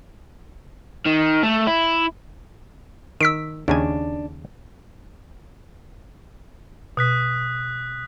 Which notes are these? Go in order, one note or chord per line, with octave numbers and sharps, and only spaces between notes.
D#3
A3
E4
D#3 E6 B6 D7
D#2 C#3 D4 G#5
B2 D#6 F#6 B6